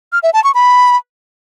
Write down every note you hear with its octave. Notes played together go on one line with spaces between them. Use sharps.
F6
E5
A5
C#6
B5